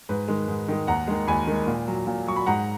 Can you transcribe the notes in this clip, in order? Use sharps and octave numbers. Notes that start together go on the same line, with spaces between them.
G#2 B4
D#3 G#3
G#2
D#3 G#3
D#2 F#5 A#5
D#3 G#3
D#2 G#5 B5
D#3 G#3
A#2
F#3
A#2
F#3 C#6
B5
G#2 F#5 A#5